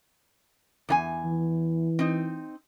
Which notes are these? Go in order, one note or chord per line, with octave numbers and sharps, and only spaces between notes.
E2 D#4 G#5
E3
C4 D#4